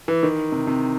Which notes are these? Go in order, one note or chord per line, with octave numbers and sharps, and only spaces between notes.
E3
D#3
C3
C3